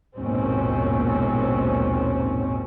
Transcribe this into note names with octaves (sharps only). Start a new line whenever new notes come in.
A#1 D#2 G#2 B2 C4 C#4